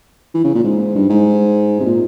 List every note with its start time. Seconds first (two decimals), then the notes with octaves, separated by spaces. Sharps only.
0.34 E3
0.44 C#3
0.55 A#2
0.64 G#2
0.95 G2
1.10 G#2
1.80 C3
1.85 A#2